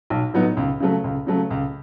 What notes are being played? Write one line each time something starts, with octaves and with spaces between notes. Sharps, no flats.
B1
A2 F#3 B3 D#4
C#2
C#3 F#3 A3
C#2
C#3 F#3 A3
C#2